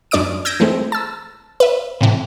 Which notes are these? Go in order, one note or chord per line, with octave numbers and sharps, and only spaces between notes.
F#2 D4 D5 D6 D#6 D7
E6 G6 G#6 A#6 D7
E3 G#3 A3 C4
A5 E6
B4 E5
A2 C3 E3